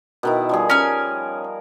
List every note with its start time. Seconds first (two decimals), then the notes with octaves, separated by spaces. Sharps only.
0.23 B2 D#3 E4
0.49 F3 G3 G#4
0.70 C#4 A#4 G#5